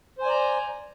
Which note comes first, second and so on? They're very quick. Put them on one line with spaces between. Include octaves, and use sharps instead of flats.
C5 G#5 D5 A#5